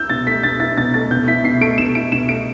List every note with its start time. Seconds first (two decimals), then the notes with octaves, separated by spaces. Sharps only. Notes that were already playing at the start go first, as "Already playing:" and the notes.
Already playing: E4 E6 G6
0.09 B2 A6
0.26 A3 B6
0.43 B2 A6
0.60 E4 A6
0.77 B2 A6
0.94 A3 A6
1.11 B2 G6
1.27 E4 B6
1.44 B2 C7
1.61 A3 D7
1.78 B2 E7
1.95 E4 D7
2.12 B2 E7
2.29 A3 D7